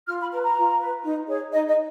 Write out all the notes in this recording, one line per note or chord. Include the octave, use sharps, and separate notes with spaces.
F4 F6
B5
B4 A#5
A#5
F4
B4
D#4
G#4 C#5
D#4 D#5
D#5